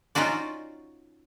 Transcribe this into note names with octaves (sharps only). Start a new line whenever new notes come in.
C#4 D#4 F4 F#4 D5